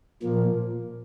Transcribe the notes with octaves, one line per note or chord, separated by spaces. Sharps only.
A#2 F3 A#3